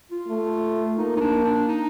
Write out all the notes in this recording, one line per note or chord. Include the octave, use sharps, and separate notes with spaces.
F4
A3
A#3 D#4
D#4
D4
D4
D#4